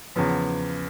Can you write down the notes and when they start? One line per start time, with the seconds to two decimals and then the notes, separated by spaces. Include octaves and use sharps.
0.16 E2 C#3 F3 B3